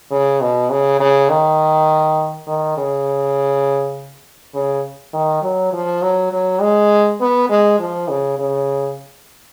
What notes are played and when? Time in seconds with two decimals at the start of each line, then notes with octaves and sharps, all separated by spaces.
0.11 C#3
0.41 B2
0.70 C#3
1.00 C#3
1.29 D#3
2.47 D#3
2.77 C#3
4.55 C#3
5.13 D#3
5.42 F#3
5.73 F3
6.02 F#3
6.32 F#3
6.61 G#3
7.21 B3
7.49 G#3
7.79 F3
8.08 C#3
8.39 C#3